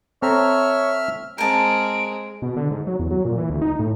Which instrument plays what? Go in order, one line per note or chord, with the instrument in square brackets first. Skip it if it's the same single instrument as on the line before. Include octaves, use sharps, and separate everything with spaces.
[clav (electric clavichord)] C4 A4 A#5 [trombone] C#5 [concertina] E5 F6
[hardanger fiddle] G#3 C4 [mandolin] A#4 A5 [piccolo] D7
[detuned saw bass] B2
D3
G#2
F#3
E2
F#3
A#2
E3
D2
D#4
A2